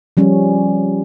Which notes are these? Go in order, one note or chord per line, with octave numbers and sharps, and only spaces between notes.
F3 G3 C#4